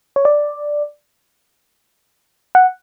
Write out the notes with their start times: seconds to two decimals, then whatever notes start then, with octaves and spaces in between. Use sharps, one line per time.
0.16 C#5
0.25 D5
2.55 F#5